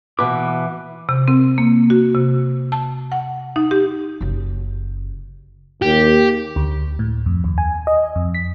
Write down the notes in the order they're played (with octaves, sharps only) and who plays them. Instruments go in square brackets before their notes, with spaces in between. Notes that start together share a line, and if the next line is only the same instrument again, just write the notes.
[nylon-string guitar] B2 B4 [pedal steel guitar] E3 E5 D6
[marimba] C3
C4
A#3
F#4
C3
A5
F#5
D#4
G4
[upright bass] F#1 C#3
[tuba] D#2 [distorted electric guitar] G4
[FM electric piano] D2
A2
F2
D#2
G#5
D#5
F2
B6